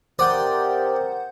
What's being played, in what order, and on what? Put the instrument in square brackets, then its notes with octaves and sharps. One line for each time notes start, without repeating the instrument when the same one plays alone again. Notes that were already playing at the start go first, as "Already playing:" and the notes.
[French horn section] C3 G4 A#4 [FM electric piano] C5 F#5 G6 [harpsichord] D5 D#6